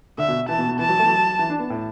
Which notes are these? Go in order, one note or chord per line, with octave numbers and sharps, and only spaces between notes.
D3 E5
B2
E3 A5
B2
B2
E3 A5
F#3
E3 A3
F#3
E3
D4
B3
A2